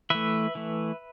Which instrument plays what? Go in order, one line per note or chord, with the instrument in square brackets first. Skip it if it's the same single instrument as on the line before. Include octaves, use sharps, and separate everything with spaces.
[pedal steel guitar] E3 A3 B4 E5
E3 A3